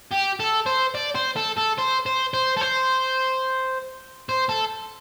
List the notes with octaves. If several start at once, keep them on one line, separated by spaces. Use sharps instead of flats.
G4
A4
C5
D5
C5
A4
A4
C5
C5
C5
A4
C5
C5
A4